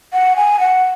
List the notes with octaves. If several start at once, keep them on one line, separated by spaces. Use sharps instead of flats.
F#5
G#5
F#5